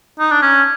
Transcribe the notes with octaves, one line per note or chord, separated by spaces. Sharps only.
D#4
D4
C#4